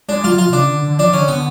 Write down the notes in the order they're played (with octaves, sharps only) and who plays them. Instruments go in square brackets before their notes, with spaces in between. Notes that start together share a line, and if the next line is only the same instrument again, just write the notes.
[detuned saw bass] G#3 [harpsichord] D4
[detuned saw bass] F#3 [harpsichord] F4
[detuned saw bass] F3 [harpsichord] F4
[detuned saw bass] B2
[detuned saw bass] C#3 [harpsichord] D4
[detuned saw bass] D3
D3
[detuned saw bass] F3 [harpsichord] D4
[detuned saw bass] D3 [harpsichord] C#4
[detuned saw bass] D3 [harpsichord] B3